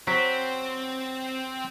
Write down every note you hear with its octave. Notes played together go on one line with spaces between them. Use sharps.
F#3 C4 C5 B6